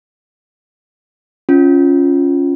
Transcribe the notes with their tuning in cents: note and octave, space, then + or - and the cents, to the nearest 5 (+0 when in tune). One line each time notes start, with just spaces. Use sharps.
C#4 +0 F4 +0